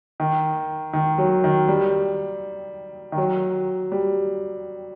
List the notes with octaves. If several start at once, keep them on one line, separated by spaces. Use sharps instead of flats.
D#3
D#3
F#3
D#3
G3
D#3
F#3
G3